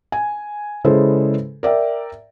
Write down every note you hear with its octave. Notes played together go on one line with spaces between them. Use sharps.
G#5
C#3 G#3 E4 A4 B4 C5
A#4 D5 E5 G5